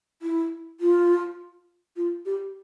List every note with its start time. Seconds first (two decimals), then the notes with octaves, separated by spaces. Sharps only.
0.22 E4
0.80 F4
1.96 F4
2.26 G4